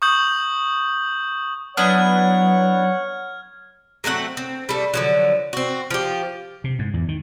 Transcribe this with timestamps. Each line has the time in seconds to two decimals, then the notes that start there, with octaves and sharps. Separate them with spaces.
0.02 C#6 D#6 G6 F#7
1.77 F#3 B3 D4 E4 C#5 F#5 F6 G#6
4.04 F#3 A3 C4 F#5
4.37 C4
4.69 G3 A3
4.94 D3 F3 F#3
5.53 C4 F#4
5.91 F3 G4
6.64 C3
6.79 G#2
6.94 E2
7.08 D#3